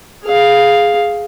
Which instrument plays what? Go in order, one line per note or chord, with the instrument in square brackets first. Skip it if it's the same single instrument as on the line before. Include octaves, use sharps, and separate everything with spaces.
[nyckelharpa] G#4 F5